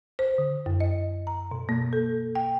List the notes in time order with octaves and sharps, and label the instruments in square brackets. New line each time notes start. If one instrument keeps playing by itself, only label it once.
[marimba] C5
D3
F#2
D#5
A#5
B2
A#3
A4
G5